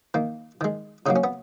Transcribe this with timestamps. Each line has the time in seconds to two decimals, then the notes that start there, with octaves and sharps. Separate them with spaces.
0.14 D#3 A#3
0.61 D#3 G#3
1.06 C#3 F#3 A#3 D#4
1.16 C#4
1.24 B3